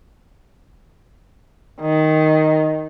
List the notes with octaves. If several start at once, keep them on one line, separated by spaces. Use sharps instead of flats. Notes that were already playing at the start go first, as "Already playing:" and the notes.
D#3